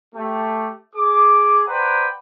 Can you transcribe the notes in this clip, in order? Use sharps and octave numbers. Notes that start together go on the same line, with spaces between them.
A3 G4
G#4 D6
B4 C5 D5 F#5 G5 A#5